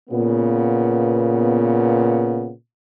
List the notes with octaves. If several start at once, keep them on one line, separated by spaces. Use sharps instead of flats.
A#2 C#3 B3